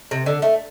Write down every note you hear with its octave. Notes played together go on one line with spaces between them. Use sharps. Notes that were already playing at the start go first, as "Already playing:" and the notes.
C3
D3
A3